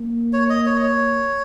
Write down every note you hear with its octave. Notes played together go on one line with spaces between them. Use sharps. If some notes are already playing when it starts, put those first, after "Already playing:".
Already playing: A#3
C#5
D#5
C#5
D#5
C#5